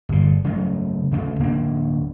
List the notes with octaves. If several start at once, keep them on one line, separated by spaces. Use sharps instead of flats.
G1 A#2
C#3 F#3 A3
D2 C#3 A3
D1 A#3 C4 D4